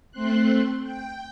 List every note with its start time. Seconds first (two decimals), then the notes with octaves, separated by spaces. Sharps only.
0.11 A3 C4 C6 F#6
0.83 G5